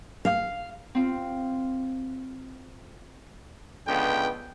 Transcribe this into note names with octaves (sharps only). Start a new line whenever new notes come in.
F5
C4 F4
C#2 D3 B3 G5